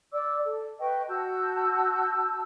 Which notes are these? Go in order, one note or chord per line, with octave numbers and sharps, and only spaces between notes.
D5 D6 E6
A4
B4 D#5 G5 C#6
F#4 A5 E6 G6